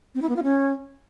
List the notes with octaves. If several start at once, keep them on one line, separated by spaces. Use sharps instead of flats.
C4
E4
B3
F4
C#4